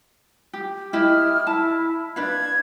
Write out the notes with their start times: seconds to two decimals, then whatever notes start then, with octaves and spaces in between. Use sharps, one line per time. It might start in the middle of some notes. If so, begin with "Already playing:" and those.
0.53 G4
0.93 E4 G4 D#5 F6
1.47 E4 A5
2.16 D4 B4 F5 G#6